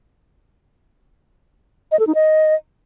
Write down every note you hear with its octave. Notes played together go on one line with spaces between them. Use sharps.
D#5
A4
D#4
D#5